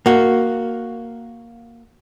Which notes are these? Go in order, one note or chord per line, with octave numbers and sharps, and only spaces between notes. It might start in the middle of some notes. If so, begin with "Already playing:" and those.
A#3 F#4